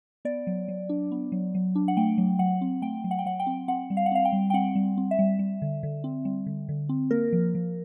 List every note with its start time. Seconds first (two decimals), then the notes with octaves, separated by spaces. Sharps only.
0.25 B3 D5
0.47 F#3
0.68 F#3
0.89 D4
1.12 B3
1.32 F#3
1.55 F#3
1.75 D4
1.88 F#5
1.97 A3 G5
2.18 F#3
2.39 F#3 F#5
2.61 C4
2.82 A3 G5
3.04 F#3
3.11 F#5
3.19 G5
3.26 F#3 F#5
3.40 G5
3.47 C4
3.68 C4 F#5
3.90 G3
3.97 F5
4.06 F#5
4.11 C4 F5
4.25 G5
4.33 G3
4.50 G5
4.54 C4 F#5
4.75 G3
4.97 C4
5.11 E5
5.19 G3
5.39 G3
5.62 D3
5.83 D3
6.04 C4
6.25 G3
6.47 D3
6.69 D3
6.89 C4
7.11 A#3 A#4
7.33 F3
7.55 F3